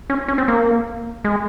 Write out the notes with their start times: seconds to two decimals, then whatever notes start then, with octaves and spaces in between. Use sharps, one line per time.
0.10 C#4
0.28 C#4
0.38 C4
0.48 A#3
1.25 G#3